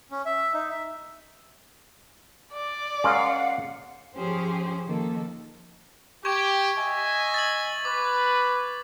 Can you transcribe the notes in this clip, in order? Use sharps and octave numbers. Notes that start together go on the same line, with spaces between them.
C#4
E5
D#4
E5
D5
G#3 C#4 A#4 F5 F#5
F3 C#4 G4 G#4 C5
D#3 F3 A#3 A4
G4 C#6 G#6
D#5 E5 G#5
A6 F#7
B4 D6